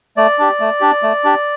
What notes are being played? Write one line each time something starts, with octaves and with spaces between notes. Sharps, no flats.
A3 D5
D4 G4
A3
D4 G4
A3
D4 G4